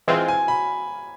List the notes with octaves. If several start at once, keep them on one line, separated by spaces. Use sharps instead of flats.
E3 G#3 C4 F4 G#5
G#5
B5